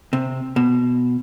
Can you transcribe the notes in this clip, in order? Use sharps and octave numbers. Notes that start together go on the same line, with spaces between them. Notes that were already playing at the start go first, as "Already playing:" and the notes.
C3
B2